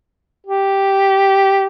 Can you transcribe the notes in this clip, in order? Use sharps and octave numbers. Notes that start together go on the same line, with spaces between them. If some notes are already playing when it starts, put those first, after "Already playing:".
G4